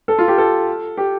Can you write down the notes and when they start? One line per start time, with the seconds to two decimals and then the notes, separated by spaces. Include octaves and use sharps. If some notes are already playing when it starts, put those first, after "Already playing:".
0.08 A4
0.18 F4
0.28 G4
0.38 A4
0.97 G4